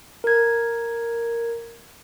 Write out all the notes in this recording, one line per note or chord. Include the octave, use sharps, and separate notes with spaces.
A#4 G#6